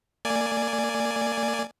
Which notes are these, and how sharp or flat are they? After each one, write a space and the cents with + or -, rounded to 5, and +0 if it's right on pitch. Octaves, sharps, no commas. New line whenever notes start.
A#3 -35 D5 +0 G#5 +0